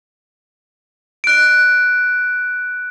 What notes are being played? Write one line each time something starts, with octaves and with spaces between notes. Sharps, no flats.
F#6 D7